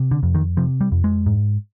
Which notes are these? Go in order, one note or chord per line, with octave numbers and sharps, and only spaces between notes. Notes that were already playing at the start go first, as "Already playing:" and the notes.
Already playing: C3
D3
F2
D#3
C3 F3
G3
F2
G#3
G#2